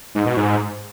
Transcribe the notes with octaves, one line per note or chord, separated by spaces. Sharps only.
G#2
B2
G#2